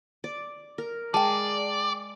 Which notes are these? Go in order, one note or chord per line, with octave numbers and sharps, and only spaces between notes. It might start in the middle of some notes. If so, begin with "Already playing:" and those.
D5
A#4
G#3 D5 G5 A5